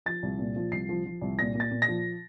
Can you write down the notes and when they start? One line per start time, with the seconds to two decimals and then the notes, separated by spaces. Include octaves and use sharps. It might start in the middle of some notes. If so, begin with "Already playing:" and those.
0.06 F3 A6
0.23 C2
0.39 A#2
0.56 F3
0.72 C2 C7
0.89 F3
1.05 F3
1.21 C2
1.39 A#2 A#6
1.55 A#2
1.60 A6
1.71 A#2
1.82 A#6
1.88 F3